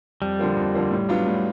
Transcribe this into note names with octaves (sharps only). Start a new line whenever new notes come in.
F2 G3
D3 F3 A#3
F2
D3 F3 A#3
A2
F#3 B3 D4 F4
A2